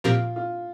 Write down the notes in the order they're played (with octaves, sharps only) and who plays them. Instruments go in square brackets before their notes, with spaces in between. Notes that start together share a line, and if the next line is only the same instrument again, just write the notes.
[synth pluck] A#2 F3 C4 G4 A#4 [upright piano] F4
[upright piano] F4